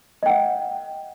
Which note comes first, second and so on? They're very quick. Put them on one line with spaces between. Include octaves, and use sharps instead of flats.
D#5 G5 F#5